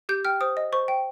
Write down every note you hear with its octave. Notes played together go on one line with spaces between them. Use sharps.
G4 G6
G5 F6
C5 D#6
D#5
C5 C#6
G5